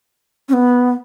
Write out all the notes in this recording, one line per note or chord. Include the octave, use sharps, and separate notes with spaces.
C#4
B3